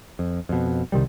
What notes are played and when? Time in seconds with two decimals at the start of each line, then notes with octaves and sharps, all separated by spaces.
0.19 F2
0.49 F2 B2
0.92 C2 C3 D#3 G3